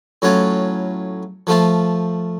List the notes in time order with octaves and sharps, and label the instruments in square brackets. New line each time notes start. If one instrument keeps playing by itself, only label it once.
[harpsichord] A2 F#3 C#4 F4
F3 A3 F4